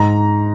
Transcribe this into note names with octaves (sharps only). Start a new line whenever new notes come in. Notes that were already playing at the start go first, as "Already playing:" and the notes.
Already playing: G#2 A#5